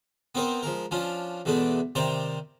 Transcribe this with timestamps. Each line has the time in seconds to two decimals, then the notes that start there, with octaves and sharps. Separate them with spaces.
0.35 B3 C4 D#4 A#4 C5
0.63 F3 G#3 A#4
0.91 F3 C#4 D4 F4
1.45 E2 B2 G#3 A3 B3 D4
1.95 C3 D#3 C5 D5 A#5